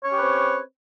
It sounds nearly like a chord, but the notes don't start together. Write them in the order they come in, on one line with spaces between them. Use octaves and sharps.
C#5 C#4 G4 B4 C4